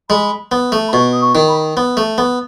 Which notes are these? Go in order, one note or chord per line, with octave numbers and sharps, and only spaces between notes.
G#3 B5
B3
A3
B5
B2 C#6
D#6
C#6
D#3
B5
B3
A3
B3